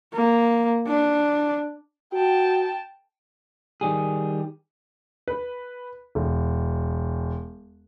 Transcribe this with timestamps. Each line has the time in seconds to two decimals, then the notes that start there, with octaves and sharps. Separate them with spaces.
0.14 A#3
0.87 D4
2.13 F#4 G5 A5
3.81 D#3 G3 G#4
5.28 B4
6.15 E1